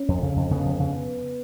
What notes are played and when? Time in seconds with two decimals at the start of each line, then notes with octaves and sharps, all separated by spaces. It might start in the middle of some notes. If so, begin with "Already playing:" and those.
Already playing: C#4
0.08 F2
0.22 C#3
0.36 F2
0.51 C#3 B3
0.65 F2
0.79 C#3